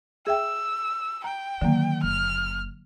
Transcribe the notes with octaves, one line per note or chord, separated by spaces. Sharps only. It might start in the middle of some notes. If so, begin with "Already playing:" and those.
G#4 E5 G5 E6
G5 A#5
D3 D#3 F#3 A#3
F#1 F6